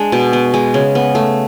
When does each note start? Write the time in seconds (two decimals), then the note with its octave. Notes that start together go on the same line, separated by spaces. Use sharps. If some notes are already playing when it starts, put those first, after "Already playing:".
Already playing: G#3 D4
0.12 B2
0.33 B3
0.54 G#3
0.74 C#3
0.95 B3
1.15 A3